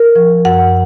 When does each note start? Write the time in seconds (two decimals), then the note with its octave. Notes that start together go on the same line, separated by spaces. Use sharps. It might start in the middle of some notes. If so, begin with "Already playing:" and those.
Already playing: A#4
0.16 F3
0.45 F#2 F#5